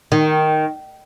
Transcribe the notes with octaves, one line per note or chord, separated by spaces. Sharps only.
D#3